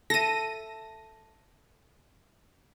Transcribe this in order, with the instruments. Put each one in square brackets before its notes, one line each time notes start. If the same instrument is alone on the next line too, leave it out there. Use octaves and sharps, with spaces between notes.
[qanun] A4 E5 [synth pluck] A#6 D#7